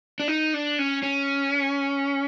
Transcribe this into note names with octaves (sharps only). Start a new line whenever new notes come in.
D4
D#4
D4
C#4
C#4